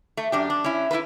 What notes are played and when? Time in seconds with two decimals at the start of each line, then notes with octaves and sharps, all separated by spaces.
0.17 A3
0.32 F#2 D4 G4
0.50 D4
0.64 C#4 E4
0.91 E4 F4 A4 B4